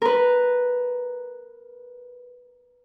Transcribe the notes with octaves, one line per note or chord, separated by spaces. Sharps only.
A#4 B4